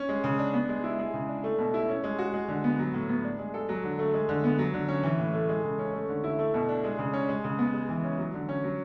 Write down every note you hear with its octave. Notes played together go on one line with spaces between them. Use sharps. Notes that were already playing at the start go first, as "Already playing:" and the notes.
Already playing: C#4
G#3
C#3
D4
B3
G#3
E4
G#3
C#3
D4
A3
B2
E4
C#4
G#3
F#4
G#3
D3
B3
F#3
A2
B3
D4
G#3
A4
F#3
D3
A3
G#3
D3
B3
F#3
D3
C#4
E3
A2
A3
G#3
C#3
C#4
A3
D3
E4
A3
B2
D4
G#3
C#3
C#4
G#3
C#3
B3
G#3
E3
C#4
F#3
D3
C#4
F#3